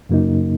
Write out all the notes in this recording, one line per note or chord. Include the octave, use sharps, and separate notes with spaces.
F#2 C#3 F#3 A#3 D#4